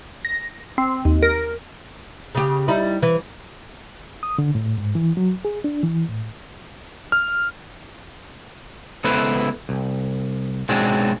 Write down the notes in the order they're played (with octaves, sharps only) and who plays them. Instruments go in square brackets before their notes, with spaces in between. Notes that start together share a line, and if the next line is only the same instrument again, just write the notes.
[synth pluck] A#6
C4
D#2
A#4
[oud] C#3 G4
G3 D#4 E4
E3
[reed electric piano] D#6
D3
A2
G#2
E3
F#3
G#4
D4
E3
A2
[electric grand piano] F6
[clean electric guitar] C#2 B3 E4 A4 B4 C5
C2
B1 F#3 G#3 C4 D4